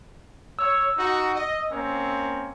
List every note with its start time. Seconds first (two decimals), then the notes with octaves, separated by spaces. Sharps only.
0.59 C#5 E6
0.96 D#4 F#4
1.34 D#5
1.69 A#3 C4 C#4